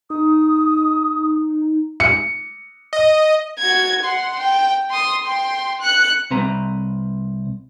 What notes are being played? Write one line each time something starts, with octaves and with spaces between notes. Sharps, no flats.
D#4 D#6
C#7
D#5
F#4 G#6
F#5 C6
G5
C6 D#6
G5 C6
F#6 C#7
C2 C4 B4 A#5